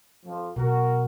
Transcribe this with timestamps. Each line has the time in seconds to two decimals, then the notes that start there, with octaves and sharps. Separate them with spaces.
0.25 F2 F3
0.56 B2 F#4 A#4